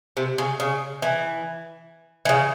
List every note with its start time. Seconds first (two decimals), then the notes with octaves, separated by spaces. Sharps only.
0.17 C3
0.38 C#3
0.60 C#3
1.02 E3
2.25 E3
2.29 C#3